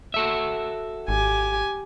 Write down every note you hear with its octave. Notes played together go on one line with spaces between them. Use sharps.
F#4 A4 E5
G#1 G4 G#5